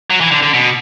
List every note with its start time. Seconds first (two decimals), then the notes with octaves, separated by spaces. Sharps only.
0.10 F#3
0.21 E3
0.31 D3
0.43 D3
0.54 B2